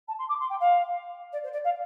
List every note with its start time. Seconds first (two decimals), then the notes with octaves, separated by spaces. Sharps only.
0.08 A5
0.18 C6
0.29 D6
0.40 C6
0.49 G5
0.60 F5
1.32 D5
1.43 C5
1.53 D5
1.64 F5